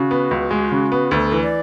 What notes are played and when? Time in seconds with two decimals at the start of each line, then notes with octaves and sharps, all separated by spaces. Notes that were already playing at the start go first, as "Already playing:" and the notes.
Already playing: C#3 F#4
0.11 B3
0.31 C#2
0.51 G#3
0.71 C#3
0.92 B3
1.11 D2 A4
1.32 E3
1.41 D5